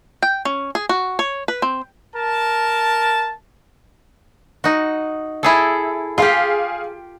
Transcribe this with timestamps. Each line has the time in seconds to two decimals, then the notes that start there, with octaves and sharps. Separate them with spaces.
0.23 G5
0.45 C#4
0.75 G#4
0.89 F#4
1.19 C#5
1.48 B4
1.62 C4
2.16 A#4 A5
4.64 D#4 F#4
5.43 E4 G#4 A4
6.18 F4 G4 G#4 F5